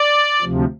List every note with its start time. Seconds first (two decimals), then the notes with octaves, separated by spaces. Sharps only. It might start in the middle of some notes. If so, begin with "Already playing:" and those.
Already playing: D5
0.42 D2 C3 F3